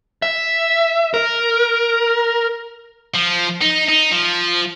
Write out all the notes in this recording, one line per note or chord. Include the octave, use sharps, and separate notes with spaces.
E5
A#4
F3
D#4
D#4
F3